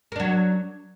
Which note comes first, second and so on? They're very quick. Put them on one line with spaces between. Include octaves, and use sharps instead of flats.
A#4 D4 F#3